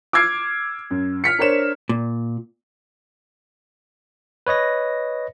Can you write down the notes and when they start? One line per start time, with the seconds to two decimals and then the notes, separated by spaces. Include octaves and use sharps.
0.13 D6 E6 F6 G#6 C7 D7
0.91 F#2
1.24 F6 B6 C#7
1.38 D4 A#4 C5 C#5 E7
1.89 A#2
4.47 B4 C#5 D#5 A#6